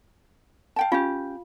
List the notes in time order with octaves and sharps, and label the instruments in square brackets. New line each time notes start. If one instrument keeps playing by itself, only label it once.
[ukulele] F5 G5 A5
[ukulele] C#4 G4 [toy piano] F4 F5